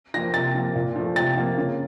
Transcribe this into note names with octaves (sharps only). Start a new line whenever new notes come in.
F3 A#3 A#6
C3 A6
F3 A#3
A#2
F3 A3
C3 A6
F3 A#3
C#3